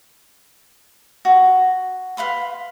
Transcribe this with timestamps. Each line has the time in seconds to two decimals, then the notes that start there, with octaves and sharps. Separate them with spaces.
1.25 F#4
2.17 B4 F5 B5 C6